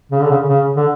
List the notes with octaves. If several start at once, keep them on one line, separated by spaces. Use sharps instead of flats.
C#3
D3
C#3
C#3
D3